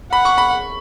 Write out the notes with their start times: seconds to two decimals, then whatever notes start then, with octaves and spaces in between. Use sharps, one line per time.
0.12 F#5 B5
0.25 C#6
0.38 B5